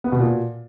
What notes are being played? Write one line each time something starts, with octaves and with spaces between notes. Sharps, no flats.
B3
B2
A#2